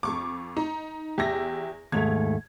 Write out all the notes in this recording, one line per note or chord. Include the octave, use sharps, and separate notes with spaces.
F2 C#6 D6
D#4
E2 G4 E5 A#6
D#2 G#2 A3 G#6 F7